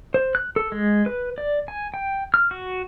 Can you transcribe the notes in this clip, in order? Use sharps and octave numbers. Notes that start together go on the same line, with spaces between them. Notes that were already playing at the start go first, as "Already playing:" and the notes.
C5
F#6
A4
G#3
B4
D5
G#5
G5
F6
F#4